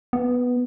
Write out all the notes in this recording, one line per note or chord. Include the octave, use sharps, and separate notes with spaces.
B3